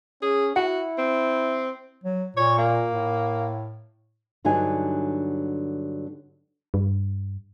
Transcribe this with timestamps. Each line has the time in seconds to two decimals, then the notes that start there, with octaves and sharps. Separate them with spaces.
0.22 C#4 G#4
0.56 E4 F#4 F#5
0.98 C4
2.04 F#3
2.37 A#2 C#5
2.58 A#3
2.91 A2
4.45 G2 D3 F#3 D#4 G#5
6.74 G2